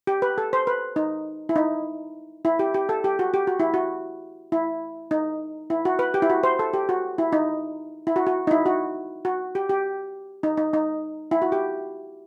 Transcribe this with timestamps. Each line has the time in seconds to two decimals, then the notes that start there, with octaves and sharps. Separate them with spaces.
0.07 G4
0.22 B4
0.38 A4
0.53 C5
0.67 B4
0.96 D#4
1.49 E4
1.56 D#4
2.45 E4
2.59 G4
2.74 G4
2.89 A4
3.04 G4
3.19 F#4
3.34 G4
3.47 F#4
3.60 E4
3.74 F#4
4.52 E4
5.11 D#4
5.70 E4
5.85 F#4
5.99 B4
6.14 G4
6.22 E4
6.30 F#4
6.43 C5
6.59 A4
6.74 G4
6.89 F#4
7.18 E4
7.33 D#4
8.07 E4
8.16 F#4
8.27 F#4
8.47 D#4
8.51 E4
8.66 F#4
9.25 F#4
9.55 G4
9.70 G4
10.43 D#4
10.57 D#4
10.73 D#4
11.31 E4
11.42 F#4
11.52 G4